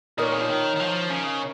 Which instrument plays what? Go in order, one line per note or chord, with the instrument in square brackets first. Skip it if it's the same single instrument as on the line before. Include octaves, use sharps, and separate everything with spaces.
[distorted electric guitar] A#2 [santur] D#4 A#4 C#5
[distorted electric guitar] G#3
F3
D#3
D#3
F3
C#3